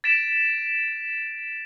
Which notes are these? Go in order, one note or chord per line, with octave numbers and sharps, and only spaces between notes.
A6 B6 D7 E7